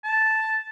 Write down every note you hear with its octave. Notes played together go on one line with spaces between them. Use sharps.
A5